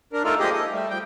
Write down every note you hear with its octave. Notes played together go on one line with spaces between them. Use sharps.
D4 A#4
A3 D#4 F4 A4 A#4
F3 G#3 A#3 G4 G#4 D#5
A4 D#5
G3 A3
F3 G3 G5